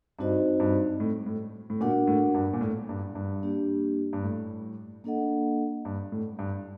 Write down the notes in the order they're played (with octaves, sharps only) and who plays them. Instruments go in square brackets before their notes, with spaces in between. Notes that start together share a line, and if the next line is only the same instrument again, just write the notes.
[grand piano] G2 [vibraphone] C4 D#4 F#4 C5 D#5
[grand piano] G2
A2
A2
A2
[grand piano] A#2 [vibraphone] D4 F#4 A#4 F#5
[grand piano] A2
G2
A#2
A2
G2
G2
[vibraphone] A#3 D4 G4
[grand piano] G2
A2
[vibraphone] A#3 D4 A4 D#5 F#5
[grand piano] G2
A2
G2